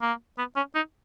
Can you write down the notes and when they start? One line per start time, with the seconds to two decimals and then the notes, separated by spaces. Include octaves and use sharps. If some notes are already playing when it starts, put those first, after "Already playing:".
0.02 A#3
0.38 B3
0.56 C#4
0.75 D#4